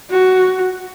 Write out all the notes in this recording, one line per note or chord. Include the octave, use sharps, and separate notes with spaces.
F#4